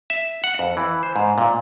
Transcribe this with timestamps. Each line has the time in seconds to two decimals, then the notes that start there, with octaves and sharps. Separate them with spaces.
0.10 E5
0.44 F#5
0.59 F2
0.77 E3
1.03 C5
1.16 G#2
1.38 A#2